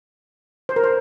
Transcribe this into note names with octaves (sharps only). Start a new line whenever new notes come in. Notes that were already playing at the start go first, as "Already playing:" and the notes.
C5
A#4
C5